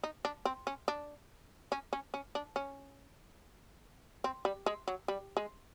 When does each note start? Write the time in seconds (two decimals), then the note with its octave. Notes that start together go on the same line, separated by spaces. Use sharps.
0.04 D#4
0.25 D4
0.45 C4
0.67 C#4
0.88 D4
1.72 C#4
1.93 C#4
2.14 C#4
2.35 D4
2.56 C#4
4.24 C4
4.45 G3
4.66 G#3
4.88 F#3
5.08 G3
5.37 G#3